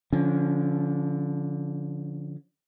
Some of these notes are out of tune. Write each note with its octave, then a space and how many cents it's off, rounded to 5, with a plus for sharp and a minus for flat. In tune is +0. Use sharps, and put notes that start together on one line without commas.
D3 -20 F3 +0 C#4 +0